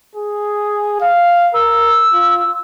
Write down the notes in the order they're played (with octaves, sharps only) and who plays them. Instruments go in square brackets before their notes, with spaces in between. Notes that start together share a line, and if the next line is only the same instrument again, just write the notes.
[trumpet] G#4
F5
[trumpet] A#4 [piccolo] E6
[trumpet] F4